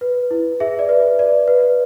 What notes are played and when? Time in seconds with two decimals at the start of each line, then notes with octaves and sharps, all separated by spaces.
0.01 B4
0.31 E4
0.60 G#4 E5
0.79 D5
0.89 B4
1.19 D5
1.48 B4